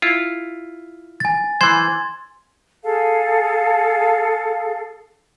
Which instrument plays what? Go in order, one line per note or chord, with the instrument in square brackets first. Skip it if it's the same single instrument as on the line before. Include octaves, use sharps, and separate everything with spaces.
[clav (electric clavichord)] E4 F4
[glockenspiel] G#5 A6
[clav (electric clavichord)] E3 C5 [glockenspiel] C6 G#6
[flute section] G#4 A4 F5